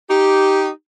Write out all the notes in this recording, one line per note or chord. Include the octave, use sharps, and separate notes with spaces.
D#4 G4